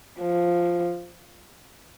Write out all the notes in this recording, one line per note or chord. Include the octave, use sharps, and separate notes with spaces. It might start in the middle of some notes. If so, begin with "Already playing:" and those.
F3